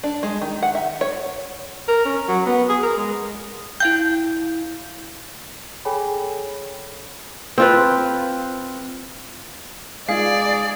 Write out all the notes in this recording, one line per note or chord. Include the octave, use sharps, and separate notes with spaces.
D4
G#3
D#3
F#5
E5
C#5
A#4
C#4
F#3
B3
G#4
A#4
G#3
E4 F5 G5 G6
G#4 A4 C#5 G5 G#5 B5
C4 F4 B4
G#3 D#4 F4 G#4 D5 F5